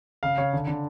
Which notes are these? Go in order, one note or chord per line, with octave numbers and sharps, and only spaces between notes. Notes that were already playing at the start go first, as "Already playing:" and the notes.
C#3 F5
C#3 C#5
D3
D3